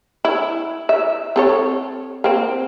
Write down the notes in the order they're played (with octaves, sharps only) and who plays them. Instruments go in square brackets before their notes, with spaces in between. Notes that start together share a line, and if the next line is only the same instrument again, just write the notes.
[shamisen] E4
E5
C4 A4 C#5
A#3 C4